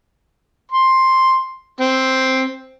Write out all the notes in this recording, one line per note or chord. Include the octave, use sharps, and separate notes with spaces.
C6
C4